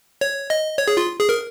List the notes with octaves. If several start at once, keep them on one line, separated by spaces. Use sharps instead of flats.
C#5
D#5
C#5
G#4
F4
G#4
A#4